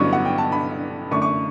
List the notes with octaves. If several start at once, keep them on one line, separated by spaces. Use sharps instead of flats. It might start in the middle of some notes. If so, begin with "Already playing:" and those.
Already playing: A1 G2 D3 F#3 B3 C#6
F#5
G5
A5
B5
F#2 D3 A3 C#6
C#6